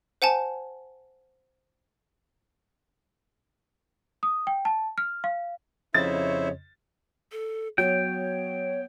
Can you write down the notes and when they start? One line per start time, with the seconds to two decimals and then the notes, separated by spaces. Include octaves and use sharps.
0.22 C5 F#5 G#5 A5
4.23 D#6
4.47 G5
4.65 A5
4.98 F6
5.24 F5
5.94 F2 C#3 E4 C5 C#5 D#5 E5 A6
7.32 A4
7.78 F#3 B3 C#5 G5